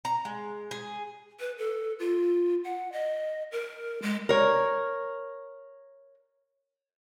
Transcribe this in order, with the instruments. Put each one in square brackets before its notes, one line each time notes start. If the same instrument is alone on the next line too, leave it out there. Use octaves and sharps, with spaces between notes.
[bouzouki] A#5
G#3
G#4
[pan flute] B4
A4
F4
F#5
D#5
A#4
G#3
[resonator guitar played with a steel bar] A#4 C#5